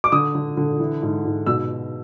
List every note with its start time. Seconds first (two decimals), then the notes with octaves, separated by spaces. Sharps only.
0.04 D6
0.12 D3 D#6
0.35 D3
0.57 D3
0.80 E3
1.02 G#2
1.25 G#2
1.46 B2 E6